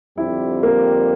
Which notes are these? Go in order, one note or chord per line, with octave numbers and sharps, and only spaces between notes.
F2 D3 G3 C4 E4 G4
A#3